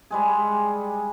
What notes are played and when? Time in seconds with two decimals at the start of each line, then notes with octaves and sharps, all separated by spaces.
0.11 G3 G#3 G#4